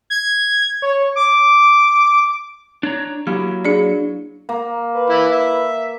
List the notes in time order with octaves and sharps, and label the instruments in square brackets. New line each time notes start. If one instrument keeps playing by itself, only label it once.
[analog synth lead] G#6
C#5
D6
[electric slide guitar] D4 C#5 A#5
[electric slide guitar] F#3 A#3 E4 [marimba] G4
[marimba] D4 G#4 D5
[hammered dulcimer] A#3
[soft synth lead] B4
[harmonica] E3 E4
E5